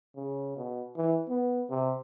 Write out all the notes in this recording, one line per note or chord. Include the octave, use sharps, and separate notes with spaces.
C#3
B2
E3
B3
C3